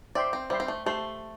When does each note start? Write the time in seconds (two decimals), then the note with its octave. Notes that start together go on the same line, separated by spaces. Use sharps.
0.15 C5 D5 E5 G5 C6
0.33 C4
0.50 G3 C5 E5 G5 C6
0.60 C4
0.68 A3
0.86 A3 G4 C5 A5 C6